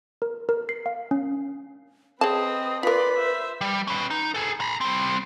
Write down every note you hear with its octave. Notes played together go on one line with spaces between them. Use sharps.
A#4
A#4
C7
F5
C#4
C4 G#4 B4 C#5 D#5 A5 D#6
F4 A#4 B4 D5 B5 C6
C5 E5
G3
C#4 B4
D#4
G#4 A4
A#5 B5
G3 C4